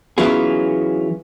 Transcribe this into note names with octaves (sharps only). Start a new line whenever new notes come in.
E3 F#3 B3 C#4 F4 G#4